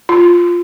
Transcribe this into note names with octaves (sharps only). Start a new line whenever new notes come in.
F4